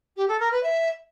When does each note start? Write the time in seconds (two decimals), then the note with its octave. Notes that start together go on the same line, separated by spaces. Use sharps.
0.16 G4
0.28 A4
0.39 A#4
0.51 B4
0.63 E5